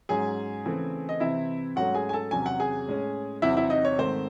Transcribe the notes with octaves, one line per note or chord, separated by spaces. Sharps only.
G#2 F#3 C#4 G#4 G#5
C#3 E3 A3 C4
D#5
C3 E3 C4 E4 E5
G#2 F#3 A3 C#4 F#4 F#5
G#4 G#5
G#5
A4 A5
E2 C3 F#3 C#4 G#5
F#5
G#4 G#5
A2 G#3 C#4
E2 C3 F#3 C4 E4 E5
E4 E5
D#4 D#5
C#5
G#2 D#3 A3 C4 C5